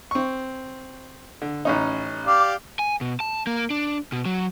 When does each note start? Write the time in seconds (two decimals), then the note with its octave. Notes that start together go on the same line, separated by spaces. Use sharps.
0.11 C4 C#6
1.42 D3
1.65 A1 C#4 D#4
2.26 G4 D5 F5
2.79 G#5
3.01 B2
3.20 A5
3.47 A#3
3.70 D4
4.12 B2
4.25 F#3